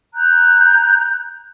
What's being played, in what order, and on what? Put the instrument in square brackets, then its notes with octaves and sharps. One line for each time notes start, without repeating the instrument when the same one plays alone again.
[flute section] A#5 F#6 G6